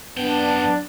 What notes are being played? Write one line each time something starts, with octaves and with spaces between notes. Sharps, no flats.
F#2 B3 D4 G5